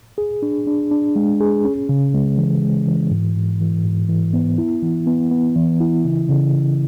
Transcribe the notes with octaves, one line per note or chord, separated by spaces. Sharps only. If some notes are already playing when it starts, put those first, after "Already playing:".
G#4
D4
D4
D4
G#3
G#4
C#4
C#3
G#3
E3
G#3
E3
G#2
G#2
E3
G#2
E3
B3
E4
E3
B3
B3
E3
E4
C#3
C#3
C#3